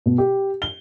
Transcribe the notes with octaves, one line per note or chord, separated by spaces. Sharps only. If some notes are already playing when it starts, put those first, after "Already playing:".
B2
G4
G7